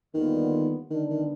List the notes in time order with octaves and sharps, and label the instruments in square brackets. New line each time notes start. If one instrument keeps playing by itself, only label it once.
[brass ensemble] D#2 D3 G3 B3 F4 [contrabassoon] D#3
[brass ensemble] D3 G3 B3 D4 [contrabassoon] D#3
[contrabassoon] D#3